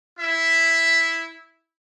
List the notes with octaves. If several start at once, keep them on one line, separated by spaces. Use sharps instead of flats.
E4 E5